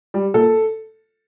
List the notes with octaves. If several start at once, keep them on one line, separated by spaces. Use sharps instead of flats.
G3
A#2 A4